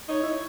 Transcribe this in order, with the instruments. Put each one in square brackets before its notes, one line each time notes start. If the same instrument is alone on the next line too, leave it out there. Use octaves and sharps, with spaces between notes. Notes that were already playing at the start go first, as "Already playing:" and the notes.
[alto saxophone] D#4 [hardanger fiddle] C#5
[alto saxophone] E4